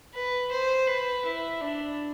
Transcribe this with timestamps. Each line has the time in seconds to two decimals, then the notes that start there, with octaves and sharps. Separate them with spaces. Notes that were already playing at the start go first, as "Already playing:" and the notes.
0.14 B4
0.52 C5
0.87 B4
1.25 E4
1.61 D4